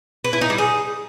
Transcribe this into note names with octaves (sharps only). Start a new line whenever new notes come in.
B4
E4
D#4
G3
G#4